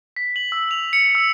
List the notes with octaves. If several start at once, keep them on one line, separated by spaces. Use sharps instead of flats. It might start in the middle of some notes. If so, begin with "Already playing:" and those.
B6
F#7
E6
F7
C#7
E6